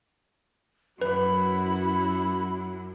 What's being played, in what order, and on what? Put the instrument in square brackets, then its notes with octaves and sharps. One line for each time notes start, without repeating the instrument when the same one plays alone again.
[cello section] F#2 [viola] E4 F#4 [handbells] B4 [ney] B5